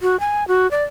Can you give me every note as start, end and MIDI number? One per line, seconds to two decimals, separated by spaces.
0.02 0.19 66
0.20 0.47 80
0.48 0.70 66
0.71 0.84 74